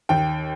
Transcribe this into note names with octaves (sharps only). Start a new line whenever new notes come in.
D#2 G5